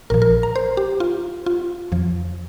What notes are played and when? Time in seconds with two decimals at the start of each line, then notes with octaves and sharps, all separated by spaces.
0.10 A#1 A#2 F3 A#4
0.22 A#4
0.43 A#5
0.56 C5
0.77 G4
1.00 F4
1.46 F4
1.92 F2 F3